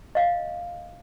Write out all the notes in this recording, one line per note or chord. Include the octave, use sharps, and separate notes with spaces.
D#5 F5